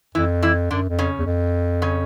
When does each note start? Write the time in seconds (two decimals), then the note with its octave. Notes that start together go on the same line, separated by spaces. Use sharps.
0.15 F2 E3 E4
0.42 E3 E4
0.70 F#2 D3 D4
0.89 F2
0.99 C#3 C#4
1.19 E2
1.26 F2
1.82 C#3 C#4